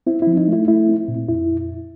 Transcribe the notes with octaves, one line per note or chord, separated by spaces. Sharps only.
C4 E4
F3 E4
D#4
A3 E4
A3 E4
C4
A#2
F2 E4